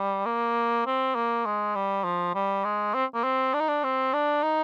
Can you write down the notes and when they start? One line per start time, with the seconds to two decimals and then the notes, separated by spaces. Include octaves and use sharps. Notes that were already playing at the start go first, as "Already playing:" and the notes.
Already playing: G3
0.26 A#3
0.86 C4
1.15 A#3
1.46 G#3
1.75 G3
2.04 F3
2.35 G3
2.64 G#3
2.94 C4
3.14 A#3
3.24 C4
3.54 D4
3.60 D#4
3.69 D4
3.84 C4
4.14 D4
4.43 D#4